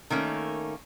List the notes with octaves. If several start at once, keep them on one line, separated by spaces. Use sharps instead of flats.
D#3 A3 A#3 C#4